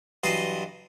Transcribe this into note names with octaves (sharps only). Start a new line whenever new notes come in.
G2 E3 F#3 D#5 A5 C6